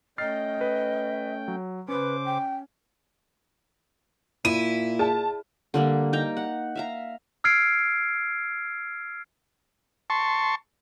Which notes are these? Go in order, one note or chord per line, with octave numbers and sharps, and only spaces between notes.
A3 C#4 D#5 G5 F6 A6 C7
B4
F#3
C#3 C#4 B4 C5 D6
G5
A#2 E4 D#7
G#4 A5
D3 G3 A#3
D#4 G5 A#5
F#5
E5 F5 A#5
E6 F6 G#6 C7 D7
A5 C6 C#6